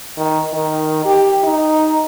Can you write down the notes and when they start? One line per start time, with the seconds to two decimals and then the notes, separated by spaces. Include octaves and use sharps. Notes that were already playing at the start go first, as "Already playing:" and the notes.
0.17 D#3
0.53 D#3
1.05 G4
1.44 D#4